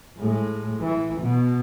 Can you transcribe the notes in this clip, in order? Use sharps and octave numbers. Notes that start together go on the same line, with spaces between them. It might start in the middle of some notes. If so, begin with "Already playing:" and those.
A2 G#3
E3
B2